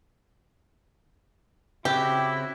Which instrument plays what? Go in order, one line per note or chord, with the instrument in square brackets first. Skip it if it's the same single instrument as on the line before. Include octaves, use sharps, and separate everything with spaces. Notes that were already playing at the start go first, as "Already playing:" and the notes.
[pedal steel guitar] C#3 C4 F#4 [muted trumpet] E4 [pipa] G4